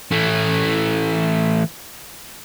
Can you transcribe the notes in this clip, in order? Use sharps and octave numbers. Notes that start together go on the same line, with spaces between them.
E3 A3